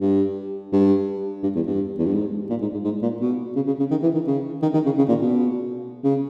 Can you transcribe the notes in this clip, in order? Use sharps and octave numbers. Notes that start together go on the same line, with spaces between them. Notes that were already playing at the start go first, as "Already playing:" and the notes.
G2
G2
G2
E2
G2
E2
G2
G#2
A#2
G#2
G#2
G#2
A#2
B2
C#3
C#3
C#3
D#3
E3
D#3
C#3
D#3
D#3
C#3
C#3
A#2
B2
C#3